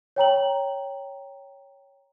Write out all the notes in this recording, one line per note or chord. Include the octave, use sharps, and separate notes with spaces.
C#5 G5 A#5 F#7